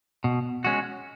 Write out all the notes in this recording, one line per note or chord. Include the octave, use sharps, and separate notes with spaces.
B2
G#3 C#4 F#4